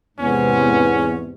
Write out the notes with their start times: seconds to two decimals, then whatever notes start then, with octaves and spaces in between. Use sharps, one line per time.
0.19 E2 G#2 C3 B3 C#4